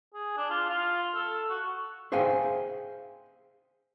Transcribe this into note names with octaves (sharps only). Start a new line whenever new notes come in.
G#4
D4
F4
F4
A4
F#4
G#4 C5 E5 F5 G5 G#5